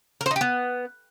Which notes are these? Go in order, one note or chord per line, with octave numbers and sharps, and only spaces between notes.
A#4
C5
D#4
G4
B3